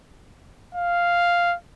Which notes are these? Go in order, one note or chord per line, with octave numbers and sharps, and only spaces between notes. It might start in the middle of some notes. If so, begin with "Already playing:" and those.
F5